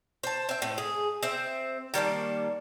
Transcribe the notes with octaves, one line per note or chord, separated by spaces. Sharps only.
C5 A5
C4 E5
A2
G#4
C4 E5
D#3 G3 A#3 A5